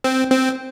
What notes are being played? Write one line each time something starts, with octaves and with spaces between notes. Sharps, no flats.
C4
C4